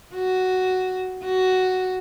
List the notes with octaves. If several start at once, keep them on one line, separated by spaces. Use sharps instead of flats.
F#4
F#4